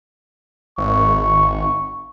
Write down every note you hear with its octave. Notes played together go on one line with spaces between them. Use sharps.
G#1 C#6